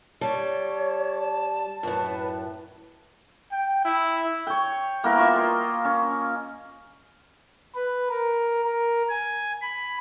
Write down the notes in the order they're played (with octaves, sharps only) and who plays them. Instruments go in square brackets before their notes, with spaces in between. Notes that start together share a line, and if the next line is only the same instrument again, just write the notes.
[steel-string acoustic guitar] G3 [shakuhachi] C#5 [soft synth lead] A5
[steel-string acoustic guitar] F#2 A2 [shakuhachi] B4
[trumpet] G5
E4
[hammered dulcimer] C#5 G5
A#3 B3 E4 A#4
F4 C5 C#6 D6
D#5 C6
C#4
[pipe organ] B4
A#4
A#4
G#5
B5